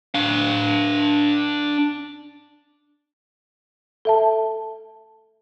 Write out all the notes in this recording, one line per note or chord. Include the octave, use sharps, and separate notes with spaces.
D4 F5
A4 E5 A5